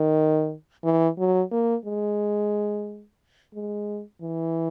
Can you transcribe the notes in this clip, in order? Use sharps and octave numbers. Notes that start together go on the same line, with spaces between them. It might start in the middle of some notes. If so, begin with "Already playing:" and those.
Already playing: D#3
E3
F#3
A#3
G#3
G#3
E3